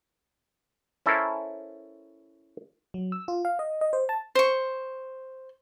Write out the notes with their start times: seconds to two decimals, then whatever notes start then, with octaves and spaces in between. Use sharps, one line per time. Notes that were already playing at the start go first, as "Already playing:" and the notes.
1.06 C#4 E4 A4 A#4 C5
2.94 F#3
3.12 E6
3.28 F4
3.45 F5
3.59 D#5
3.81 D#5
3.93 C5
4.09 A5
4.35 C5 C#6